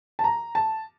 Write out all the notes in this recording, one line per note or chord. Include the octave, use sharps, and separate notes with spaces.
A5
A#5
A5